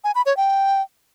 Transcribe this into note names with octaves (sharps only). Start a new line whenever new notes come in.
G#5
B5
C#5
G5